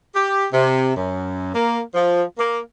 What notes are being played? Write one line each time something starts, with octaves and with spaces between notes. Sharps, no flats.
G4
C3
F#2
A#3
F3
A#3